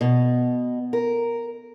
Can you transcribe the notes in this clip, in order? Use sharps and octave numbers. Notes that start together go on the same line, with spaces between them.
B2
A#4